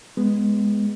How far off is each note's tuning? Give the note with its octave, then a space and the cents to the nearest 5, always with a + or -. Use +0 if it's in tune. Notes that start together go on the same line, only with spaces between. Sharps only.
G#3 +0 B3 +0